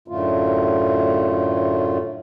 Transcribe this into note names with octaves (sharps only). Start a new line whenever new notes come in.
F#2 A2 D3 A3 F4